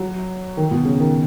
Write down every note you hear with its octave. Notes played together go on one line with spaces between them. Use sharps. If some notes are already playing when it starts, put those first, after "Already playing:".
Already playing: F#3
D#3
B2
C#3
D#3